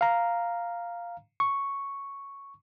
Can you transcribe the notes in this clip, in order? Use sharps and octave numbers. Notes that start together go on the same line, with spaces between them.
F5 A#5
C#6